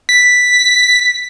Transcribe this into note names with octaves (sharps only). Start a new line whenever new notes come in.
B6